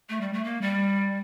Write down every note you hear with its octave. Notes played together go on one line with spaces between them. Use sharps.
A3
G3
A3
A#3
G3